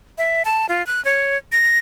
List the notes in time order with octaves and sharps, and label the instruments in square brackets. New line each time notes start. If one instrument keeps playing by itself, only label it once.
[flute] E5
A5
F4
F#6
C#5
A#6